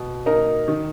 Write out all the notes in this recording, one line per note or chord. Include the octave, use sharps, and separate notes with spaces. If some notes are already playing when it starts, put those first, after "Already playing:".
Already playing: B2
A#3 D#4 A#4
D#3